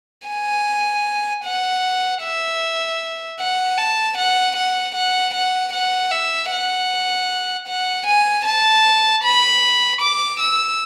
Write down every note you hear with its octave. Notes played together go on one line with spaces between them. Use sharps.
G#5
F#5
E5
F#5
A5
F#5
F#5
F#5
F#5
F#5
E5
F#5
F#5
G#5
A5
B5
D6
E6